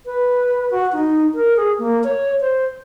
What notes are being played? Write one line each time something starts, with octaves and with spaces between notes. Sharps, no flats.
B4
F#4
D#4
A#4
G#4
A#3
C#5
C5